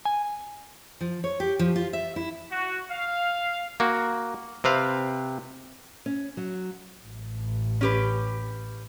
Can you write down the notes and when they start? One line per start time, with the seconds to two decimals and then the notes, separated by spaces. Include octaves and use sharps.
0.05 G#5
1.01 F3
1.24 C#5
1.40 G4
1.59 F3
1.76 F4
1.93 E5
2.16 E4
2.51 F#4
2.90 F5
3.80 A#3 F#4
4.64 C3 C4 B4 F5
6.06 C#4
6.37 F#3
7.05 A1
7.81 C#4 G4 B4